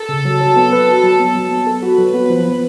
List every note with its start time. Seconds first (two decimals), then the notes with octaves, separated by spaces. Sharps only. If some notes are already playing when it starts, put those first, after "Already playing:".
Already playing: A4
0.09 C#3
0.25 F#3
0.41 F#3
0.56 B3
0.73 B4
0.88 F#4
1.03 F#3
1.19 B3
1.35 F#3
1.51 B3
1.67 A4
1.82 F#4 B4
1.99 F#3
2.14 B3
2.30 F3
2.45 B3